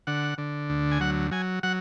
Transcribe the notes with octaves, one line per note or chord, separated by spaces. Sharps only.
D3 F#5
D3
D2
G#5
F#3 F#5
F#3 G#5
F#3 F#5